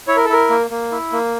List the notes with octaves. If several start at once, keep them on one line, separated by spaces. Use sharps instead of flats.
E4 C#5
A#4
A4
E4 A#4
A#3
A#3
E4
A#3